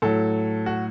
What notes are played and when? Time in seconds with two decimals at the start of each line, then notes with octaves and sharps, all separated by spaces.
0.02 A2 F#3 A4
0.66 F#4